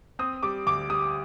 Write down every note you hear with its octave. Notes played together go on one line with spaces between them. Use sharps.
C4 D#6
G3 D6
D2 D6
G3 D#6